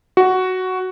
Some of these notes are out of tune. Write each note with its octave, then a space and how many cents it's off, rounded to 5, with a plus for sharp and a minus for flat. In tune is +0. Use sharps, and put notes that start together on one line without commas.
F#4 +5